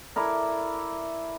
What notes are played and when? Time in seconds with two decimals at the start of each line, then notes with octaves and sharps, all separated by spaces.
0.16 E4 A4 A#4 D5